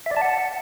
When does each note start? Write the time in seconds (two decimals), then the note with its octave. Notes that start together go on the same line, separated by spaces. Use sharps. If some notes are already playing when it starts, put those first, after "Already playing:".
0.06 E5
0.11 D5
0.16 A5
0.22 F#5